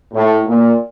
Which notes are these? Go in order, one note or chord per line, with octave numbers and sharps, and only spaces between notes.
A2
A#2